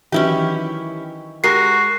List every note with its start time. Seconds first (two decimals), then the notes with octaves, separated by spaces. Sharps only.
0.12 D#3 E3 F#3 C#4 E4 G4
1.44 G#3 F#4 G4 A#4 C7